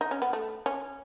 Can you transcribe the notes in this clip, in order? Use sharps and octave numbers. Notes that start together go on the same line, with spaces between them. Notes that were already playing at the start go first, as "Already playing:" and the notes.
D#4
C#4
B3
A3
C#4